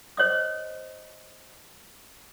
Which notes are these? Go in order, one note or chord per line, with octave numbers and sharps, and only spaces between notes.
C5 C#5 D#5 D#6